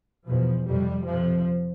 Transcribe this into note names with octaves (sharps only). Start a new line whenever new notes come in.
E2 B2 F3
F2 C3 G3
F2 C3 F3